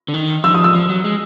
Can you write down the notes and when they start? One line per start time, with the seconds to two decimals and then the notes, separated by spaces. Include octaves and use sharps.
0.08 D3
0.14 D#3
0.44 F3 E6
0.54 D#6
0.64 E6
0.75 F3
0.89 F#3
1.04 G#3